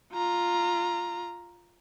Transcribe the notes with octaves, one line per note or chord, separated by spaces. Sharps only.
F4 A#5